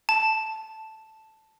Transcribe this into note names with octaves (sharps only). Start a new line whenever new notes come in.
A5